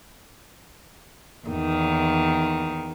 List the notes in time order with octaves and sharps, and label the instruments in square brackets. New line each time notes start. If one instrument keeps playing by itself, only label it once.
[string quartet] E2 D#3